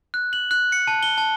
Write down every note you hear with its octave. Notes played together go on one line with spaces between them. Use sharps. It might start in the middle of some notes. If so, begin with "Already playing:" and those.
F#6
F#7
F#6
C#7
A5
G7
A5